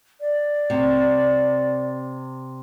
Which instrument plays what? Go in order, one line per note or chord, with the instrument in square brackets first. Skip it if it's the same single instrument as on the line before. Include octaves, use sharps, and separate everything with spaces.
[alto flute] D5
[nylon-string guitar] C3